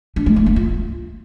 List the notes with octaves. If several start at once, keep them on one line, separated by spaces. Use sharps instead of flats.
D4
G#3
A3
A#3
F4